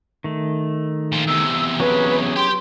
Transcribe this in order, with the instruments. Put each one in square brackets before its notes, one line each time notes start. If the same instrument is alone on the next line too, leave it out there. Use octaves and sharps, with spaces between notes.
[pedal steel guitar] D#3 A3
[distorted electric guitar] A#2 F3
[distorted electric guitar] E2 C3 [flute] E6
[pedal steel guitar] F#3 C#4 G#4 [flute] B4
[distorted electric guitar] G4 G5 [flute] C6